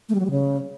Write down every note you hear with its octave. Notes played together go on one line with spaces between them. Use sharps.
A3
G3
F#3
G3
C#3